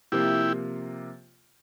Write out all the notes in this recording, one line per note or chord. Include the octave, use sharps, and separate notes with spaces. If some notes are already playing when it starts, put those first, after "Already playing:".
C3 F3 A#3 E4 F4 G4 C5